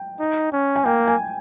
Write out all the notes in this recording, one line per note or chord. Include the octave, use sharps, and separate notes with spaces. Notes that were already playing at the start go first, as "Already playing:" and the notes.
Already playing: G5
D#4
C#4
G#5
A#3 G5
G#5